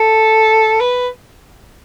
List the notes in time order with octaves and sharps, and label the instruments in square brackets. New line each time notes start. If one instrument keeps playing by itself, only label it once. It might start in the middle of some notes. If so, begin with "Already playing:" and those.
Already playing: [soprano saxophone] A4
B4